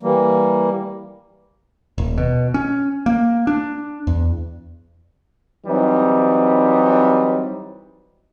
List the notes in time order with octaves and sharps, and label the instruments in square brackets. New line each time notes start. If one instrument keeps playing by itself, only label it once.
[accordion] E3 G3 A#3
[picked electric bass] D#1
B2
C#4
A#3
D4
E2
[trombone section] E3 F#3 G3 C4 D#4